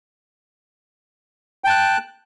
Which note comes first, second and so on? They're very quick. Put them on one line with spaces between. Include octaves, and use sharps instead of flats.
G5 A5 F#6